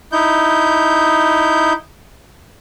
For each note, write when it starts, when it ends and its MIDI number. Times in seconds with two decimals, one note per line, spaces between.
0.12 1.73 63
0.12 1.73 64
0.12 1.73 91